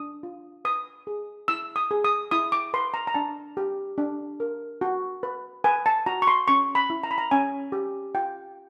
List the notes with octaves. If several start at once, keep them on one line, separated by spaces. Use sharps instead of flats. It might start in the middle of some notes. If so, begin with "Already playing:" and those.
Already playing: D4 D#6
F4
B4 D#6
G#4
E4 E6
D#6
G#4
D#6
E4 D#6
D6
B4 C6
A#5
A#5
D4 A5
G4
D4
A#4
F#4
B4
B4 G#5
A5
F#4 A#5
C#6
C6
C#4 C#6
B5
E4
A#5
B5
A#5
C#4 G#5
G4
F4 G5